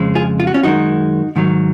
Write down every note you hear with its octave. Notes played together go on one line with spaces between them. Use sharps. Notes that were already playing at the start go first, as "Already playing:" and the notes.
Already playing: F2 C#3 G#3
F4 G#4
F4
F#4
C#4 F4
F#2 D#3 G#3 D#4 F#4
G#2 D#3 F#3